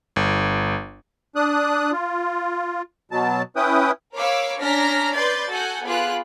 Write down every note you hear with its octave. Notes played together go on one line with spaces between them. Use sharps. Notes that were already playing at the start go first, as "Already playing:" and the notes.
G1
D4 D#6 F#6
F4
B2 F#3 A5
C#4 E4 B4 G5 D#6
A#4 C#5 F5 B5 D6 E6
C#4 D4 A#5 F6 A#6 B6
B4 D5 C6 G6 A6
F#4 A4 F#5 G#5 G6
B3 F4 G#4 B5 D6 F#6